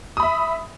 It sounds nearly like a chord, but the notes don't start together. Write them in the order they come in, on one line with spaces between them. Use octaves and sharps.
D#6 B5 E5